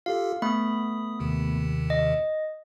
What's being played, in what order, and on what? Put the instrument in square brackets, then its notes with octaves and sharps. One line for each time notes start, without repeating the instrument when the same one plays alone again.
[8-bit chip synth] F4 G4 A4 [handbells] F5
[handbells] A3 B3 B5 [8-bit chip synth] D#6
[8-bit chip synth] D#2 C3 D#3
[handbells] D#5